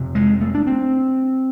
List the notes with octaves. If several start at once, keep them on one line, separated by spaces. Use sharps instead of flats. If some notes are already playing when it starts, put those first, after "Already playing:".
Already playing: F2 C3
G#3
A3
D4
C4